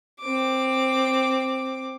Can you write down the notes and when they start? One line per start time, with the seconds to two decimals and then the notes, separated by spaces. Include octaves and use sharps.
0.21 C4 D6